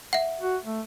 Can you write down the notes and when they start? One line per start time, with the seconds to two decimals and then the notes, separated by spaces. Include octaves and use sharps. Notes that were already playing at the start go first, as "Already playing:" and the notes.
0.13 E5 F#5
0.41 F#4
0.65 A3